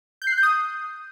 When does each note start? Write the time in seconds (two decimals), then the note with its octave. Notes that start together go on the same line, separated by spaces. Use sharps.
0.22 G6
0.27 C7
0.32 F#6
0.38 G6
0.43 D#6